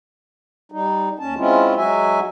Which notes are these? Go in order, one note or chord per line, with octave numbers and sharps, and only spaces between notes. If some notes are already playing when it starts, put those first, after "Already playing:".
G3 D#4
D#2 C#4 A5
G#3 C4 C#4 E4 F4
F#3 G#3 F#4 E5 G#5